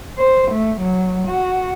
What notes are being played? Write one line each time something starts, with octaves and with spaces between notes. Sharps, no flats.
C5
A3
F#3
F#4